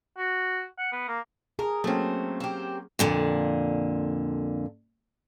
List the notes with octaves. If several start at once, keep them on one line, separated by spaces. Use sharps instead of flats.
F#4
F#5
B3
A#3
G#4 A#4
F#3 A3 A#3 C4 C#4
C4 G4
F2 A#2 D3